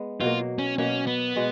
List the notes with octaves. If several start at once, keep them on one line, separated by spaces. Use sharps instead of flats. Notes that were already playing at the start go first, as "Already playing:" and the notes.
Already playing: G#3 B3
B2 F#3 A#3 F4
C#4
B2 F#3 A#3 C#4
B3
B2 G#3